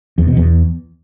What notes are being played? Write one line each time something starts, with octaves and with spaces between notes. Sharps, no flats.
E2
B2
E2